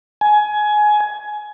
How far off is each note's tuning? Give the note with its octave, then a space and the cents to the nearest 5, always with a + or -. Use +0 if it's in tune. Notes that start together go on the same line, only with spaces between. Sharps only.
G#5 +20